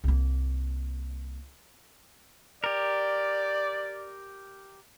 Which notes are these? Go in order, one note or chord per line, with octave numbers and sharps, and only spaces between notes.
C2 A#3
G4 A#4 D5